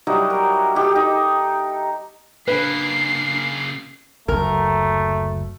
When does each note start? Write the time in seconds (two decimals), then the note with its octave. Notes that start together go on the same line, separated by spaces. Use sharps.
0.07 F#3 G3 D#4 E4
0.30 A#4
0.75 D#4 G4 A4
0.96 D#4
2.48 C#3 A#3 D4 B4 C7
4.28 F#1 D2 A3 A#4